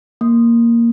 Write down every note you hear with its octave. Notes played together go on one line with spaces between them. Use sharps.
A#3